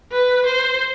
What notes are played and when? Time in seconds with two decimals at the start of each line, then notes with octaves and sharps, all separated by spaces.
0.12 B4
0.46 C5